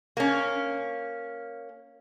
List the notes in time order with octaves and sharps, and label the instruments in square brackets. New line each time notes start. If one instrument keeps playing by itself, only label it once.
[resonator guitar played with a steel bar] A#3 C#4